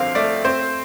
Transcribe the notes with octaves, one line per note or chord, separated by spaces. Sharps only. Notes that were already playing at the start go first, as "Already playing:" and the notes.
Already playing: F2 D3 C4 F5
A3 D5
C4 C5